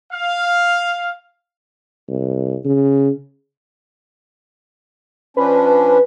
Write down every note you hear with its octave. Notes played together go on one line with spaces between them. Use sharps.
F5
C2
C#3
F3 C#4 D4 B4